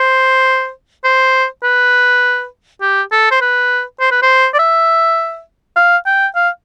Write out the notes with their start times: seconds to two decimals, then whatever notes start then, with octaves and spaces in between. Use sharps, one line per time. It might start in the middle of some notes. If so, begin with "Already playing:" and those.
Already playing: C5
1.04 C5
1.63 B4
2.81 G4
3.12 A4
3.31 C5
3.41 B4
4.00 C5
4.11 B4
4.22 C5
4.54 D5
4.59 E5
5.76 F5
6.06 G5
6.35 F5